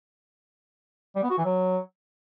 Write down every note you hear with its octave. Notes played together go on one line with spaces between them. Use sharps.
G3
B3
F#4
E3
F#3